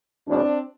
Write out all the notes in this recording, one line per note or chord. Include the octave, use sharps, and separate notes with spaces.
F#1 E2 B2 F#3 C4 D4